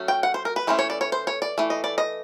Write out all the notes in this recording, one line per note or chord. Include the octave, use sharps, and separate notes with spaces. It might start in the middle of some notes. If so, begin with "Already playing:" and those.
Already playing: F#3 A3 C#4
G5
F#5
C5
A#4
B4
E3 A3 C#4 C5
C#5
D5
C#5
C5
C#5
D5
E3 A3
D#5
D5
D#5